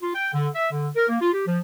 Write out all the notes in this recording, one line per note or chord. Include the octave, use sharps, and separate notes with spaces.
F4
G5
D3
E5
D3
A#4
A#3
F4
G4
F3